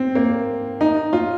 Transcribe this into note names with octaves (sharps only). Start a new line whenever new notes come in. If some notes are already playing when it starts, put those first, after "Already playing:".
Already playing: C4
A#3
D#4
F4